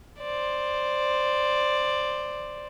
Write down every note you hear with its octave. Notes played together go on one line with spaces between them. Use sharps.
C5 D5